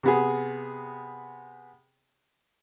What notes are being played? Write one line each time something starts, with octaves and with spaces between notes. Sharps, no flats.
C3 B3 G#4